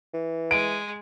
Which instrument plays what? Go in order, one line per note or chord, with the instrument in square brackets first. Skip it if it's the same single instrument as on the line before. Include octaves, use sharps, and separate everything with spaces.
[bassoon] E3
[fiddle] G#3 [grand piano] D7